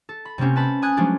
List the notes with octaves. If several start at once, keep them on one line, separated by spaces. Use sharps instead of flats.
A4
B5
C3 A3 A#3 C4 C#4
B4 A5 B5
G#5 D#6 F#6 G#6
F3 F#3 G#3 A3 D4